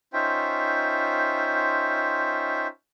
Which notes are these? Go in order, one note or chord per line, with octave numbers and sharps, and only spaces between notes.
C#4 D#4 F4 C5 E5 G5